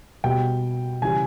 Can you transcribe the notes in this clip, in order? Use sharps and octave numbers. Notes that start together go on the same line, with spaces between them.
B2 G3 G5
C#3 E3 G3 G#5